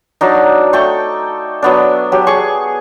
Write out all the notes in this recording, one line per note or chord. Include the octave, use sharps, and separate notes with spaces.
F#3 D4 D#4
A3 A4 G5 C#6
F#3 B3 D4
F#3 G4
G#4 C#6